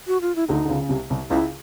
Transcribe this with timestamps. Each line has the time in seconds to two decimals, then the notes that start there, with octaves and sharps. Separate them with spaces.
0.07 F#4
0.21 F4
0.36 E4
0.48 D2 D3 D#4
0.65 D3
0.69 C#2 C#3
0.80 C#3
0.89 C2 C3
1.10 C2 C3
1.30 C#2 C#3 E4